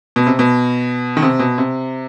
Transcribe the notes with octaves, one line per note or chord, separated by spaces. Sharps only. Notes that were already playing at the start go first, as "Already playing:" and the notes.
B2
C3
B2
D#3
C3
B2
C3